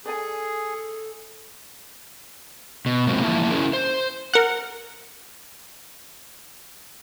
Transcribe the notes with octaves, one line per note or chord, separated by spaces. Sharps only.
G#4 A4 D5 G#5
B2
C3 F3 F#3 G#3 A#3 C4
E3 F3 A#3 E4 E5 A5
C#4 E4 G#4 A#4
C5
A#4 F#5